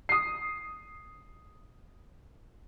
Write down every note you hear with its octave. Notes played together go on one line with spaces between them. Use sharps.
D#6 C7